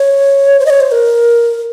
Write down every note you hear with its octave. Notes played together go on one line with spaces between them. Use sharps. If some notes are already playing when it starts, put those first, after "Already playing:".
Already playing: C#5
C5
D#5
C#5
C5
A#4